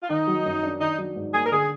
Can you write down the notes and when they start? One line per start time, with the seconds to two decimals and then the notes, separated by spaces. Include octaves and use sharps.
0.03 F4
0.10 D#3 D#4
0.27 F#3
0.46 F#2
0.63 D4
0.80 D#3 D#4
0.98 F#3
1.16 G#2
1.34 A#3 G#4
1.46 A#4
1.52 D3 G#4